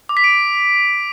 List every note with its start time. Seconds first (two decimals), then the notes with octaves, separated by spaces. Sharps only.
0.09 D6
0.17 B6
0.24 D7